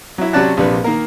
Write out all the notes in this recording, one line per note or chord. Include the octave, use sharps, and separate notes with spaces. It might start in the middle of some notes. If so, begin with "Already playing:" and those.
F#3 E4
C3 F#3 C#4 D5 A5 F#6
A#1 C3 D4 B4
D#3 A#3 A#4